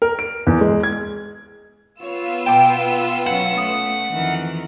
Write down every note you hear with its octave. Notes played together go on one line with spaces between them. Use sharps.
A#4
D7
E2
G#3
G#6
B3 F4 C#5 E6
B2 G5 A5 D6
F#3 C#4 F#5
A3 D#6
F2 D#3 E3